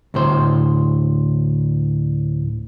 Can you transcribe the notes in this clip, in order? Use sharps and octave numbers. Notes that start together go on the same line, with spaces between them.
D2 A2 C5